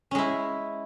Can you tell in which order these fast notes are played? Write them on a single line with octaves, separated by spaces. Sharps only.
C#4 G#3 E4